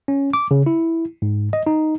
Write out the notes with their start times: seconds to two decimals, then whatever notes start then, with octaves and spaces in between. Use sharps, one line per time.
0.08 C#4
0.33 D6
0.51 C#3
0.66 E4
1.22 G#2
1.53 D#5
1.67 D#4